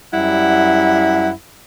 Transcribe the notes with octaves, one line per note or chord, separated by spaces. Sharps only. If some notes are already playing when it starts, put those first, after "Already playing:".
F#2 G3 E4 F#5